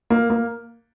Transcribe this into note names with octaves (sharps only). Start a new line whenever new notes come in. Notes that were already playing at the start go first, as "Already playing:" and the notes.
A#3
A#3